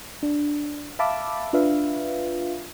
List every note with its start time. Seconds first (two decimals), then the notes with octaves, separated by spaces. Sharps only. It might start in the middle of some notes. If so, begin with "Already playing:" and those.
0.23 D4
0.99 E5 F5 A5 B5 D6 E6
1.53 D4 F4 B4 E5 F5